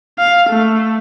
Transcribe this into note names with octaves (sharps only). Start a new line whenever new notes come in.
F5
A3